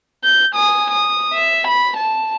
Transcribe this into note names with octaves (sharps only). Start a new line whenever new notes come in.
G6
G#5 D#6
D#6
E5
B5
A5